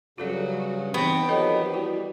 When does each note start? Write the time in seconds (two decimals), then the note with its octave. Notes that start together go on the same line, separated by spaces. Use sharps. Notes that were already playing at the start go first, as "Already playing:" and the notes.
0.18 G2 C#3 F#3 F4 F#4 A4 D5
0.94 E3 B3 C4 D#4 G5
1.29 D#3 F3 F#3 G4 A4 D#5
1.74 G3 E4 F#4